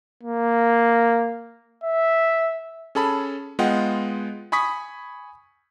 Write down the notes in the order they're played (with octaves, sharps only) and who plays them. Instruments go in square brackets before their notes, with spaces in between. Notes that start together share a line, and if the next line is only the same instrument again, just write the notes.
[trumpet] A#3
E5
[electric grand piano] C#4 G#4 A4 A5 B5
G#3 B3 F4 D#5 F#5 G5
G#5 B5 C#6 D#6 B6